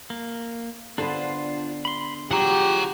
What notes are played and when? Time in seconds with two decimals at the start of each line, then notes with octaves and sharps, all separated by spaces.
0.10 A#3
0.98 D3 B3 D4 F4 C5
1.85 B5 C6
2.31 F#3 F4 G4 G#4 F#5 A#5